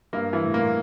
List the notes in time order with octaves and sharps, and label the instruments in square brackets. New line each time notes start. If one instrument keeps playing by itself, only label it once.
[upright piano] G2 [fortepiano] A#3
[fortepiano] E3
[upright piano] A2
[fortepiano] A#3
[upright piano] A#2